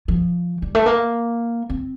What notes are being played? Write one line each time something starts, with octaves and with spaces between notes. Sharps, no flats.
F3
G3
A3
A#3
C4